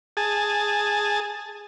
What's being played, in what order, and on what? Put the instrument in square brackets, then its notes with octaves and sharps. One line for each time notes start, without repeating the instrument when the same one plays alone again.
[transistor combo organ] G#4 A5